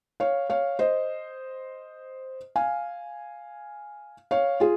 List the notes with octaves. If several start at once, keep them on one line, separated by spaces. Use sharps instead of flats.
C#5 F5
C#5 F5
C5 D#5
F5 G#5
C#5 F5
F4 G#4